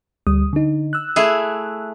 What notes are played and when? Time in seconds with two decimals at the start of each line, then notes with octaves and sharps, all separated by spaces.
0.27 D2 G3 D#6
0.53 D3 D#4
0.93 E6 F#6
1.16 A3 E4 G#4